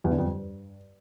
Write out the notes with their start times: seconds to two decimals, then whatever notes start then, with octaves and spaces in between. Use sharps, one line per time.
0.04 E2
0.11 D3
0.18 F2
0.25 G2